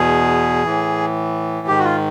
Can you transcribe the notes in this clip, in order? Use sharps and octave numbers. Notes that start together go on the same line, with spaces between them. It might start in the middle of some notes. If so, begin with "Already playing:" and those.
Already playing: E2 B2 G#4
A2 E3
G#2 D#3 G4
F#4
F4